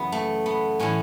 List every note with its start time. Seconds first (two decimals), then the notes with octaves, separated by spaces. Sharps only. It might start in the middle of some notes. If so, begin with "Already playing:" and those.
Already playing: F#2 C#3 E3 B3
0.12 A3
0.46 B3
0.79 A2 E3 C#4